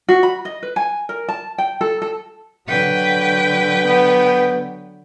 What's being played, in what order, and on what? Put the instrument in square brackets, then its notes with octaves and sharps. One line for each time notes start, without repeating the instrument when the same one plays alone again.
[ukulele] F#4
B5
D#5
B4
G#5
A#4
A5
G5
A4
A4
[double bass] D3 F#3 [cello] B4 G5
[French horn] B3